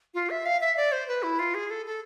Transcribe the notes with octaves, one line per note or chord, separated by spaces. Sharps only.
F4
E5
F5
E5
D5
C5
B4
E4
F4
G#4
A4
A4